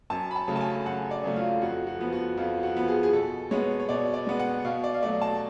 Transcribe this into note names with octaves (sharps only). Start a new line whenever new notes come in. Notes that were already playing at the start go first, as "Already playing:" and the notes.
F#2 A5
B5
A5
C#3 F#3 A3
A5
G#5
F#2 F#5
D5
C#3 F#3 A3
F4
F2 F#4
F#4
F3 B3
F#4
F2 F4
F#4
F3 B3
G#4
G#4
B2 A4
G#3 B3 C#5
C#5
B2 D5
D5
G#3 B3
F#5
B2 F5
D5
F5
F#3 A3 D5
A5